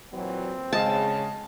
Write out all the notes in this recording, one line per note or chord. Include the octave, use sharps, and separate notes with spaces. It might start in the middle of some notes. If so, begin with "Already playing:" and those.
A#2 E3 F#3 C4
C#3 G#3 D#5 F5 A5